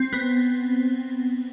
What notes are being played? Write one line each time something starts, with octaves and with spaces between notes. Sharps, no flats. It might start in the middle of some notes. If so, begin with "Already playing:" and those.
Already playing: C4
B3